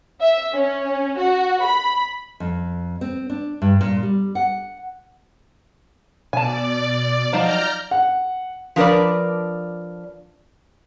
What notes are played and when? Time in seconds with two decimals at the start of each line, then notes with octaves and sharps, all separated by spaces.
0.20 E5
0.53 C#4
1.18 F#4
1.64 B5
2.40 F2
3.01 C4
3.30 D4
3.62 G2
3.81 A#2
4.03 G3
4.35 F#5
6.33 B2 D5 G#5 A5
7.33 F3 F#3 D#4 A#5 F6 G6
7.91 F#5
8.76 F3 D4 A#4 B4 D5